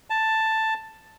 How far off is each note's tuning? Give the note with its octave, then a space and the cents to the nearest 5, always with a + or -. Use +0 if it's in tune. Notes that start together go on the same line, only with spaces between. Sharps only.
A5 +5